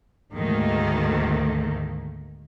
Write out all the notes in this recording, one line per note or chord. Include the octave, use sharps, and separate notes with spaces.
D2 G#2 D#3 A3 A#3